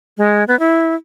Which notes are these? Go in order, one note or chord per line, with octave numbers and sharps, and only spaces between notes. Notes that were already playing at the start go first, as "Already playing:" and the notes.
G#3
B3
E4